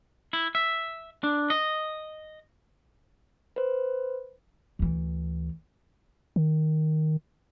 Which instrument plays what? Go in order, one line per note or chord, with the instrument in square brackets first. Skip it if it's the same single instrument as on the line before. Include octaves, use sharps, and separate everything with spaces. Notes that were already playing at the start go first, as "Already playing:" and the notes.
[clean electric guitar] E4
E5
D4
D#5
[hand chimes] B4 C5
[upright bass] D2 E3
[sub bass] D#3